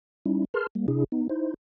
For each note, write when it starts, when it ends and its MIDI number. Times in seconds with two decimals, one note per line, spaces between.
0.26 0.45 55
0.26 0.45 61
0.26 0.45 63
0.26 0.45 64
0.54 0.67 68
0.54 0.67 70
0.54 0.67 71
0.54 0.67 81
0.54 0.67 84
0.54 0.67 89
0.75 0.86 55
0.75 0.86 58
0.88 1.04 48
0.88 1.04 62
0.88 1.04 64
0.88 1.04 68
1.12 1.28 59
1.12 1.28 63
1.29 1.54 63
1.29 1.54 64
1.29 1.54 72